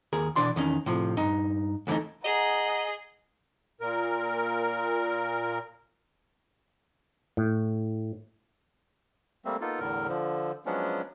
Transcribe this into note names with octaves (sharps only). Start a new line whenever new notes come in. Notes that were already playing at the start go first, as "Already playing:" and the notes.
D#2 G#4 A#4
B2 E3 D4 D5 C6
E2 D#3 C#4
A2 C3 F3
G2 D#4
D2 D3 E3 A3 D#4
G#4 D#5 F#5 A#5
A#2 A#4
A2
G3 A3 A#3 C4
A#3 B3 D#4 F4 A4
E2 A2 D3 A#4
D3 F3
F3 F#3 G#3 B3 C#4 D4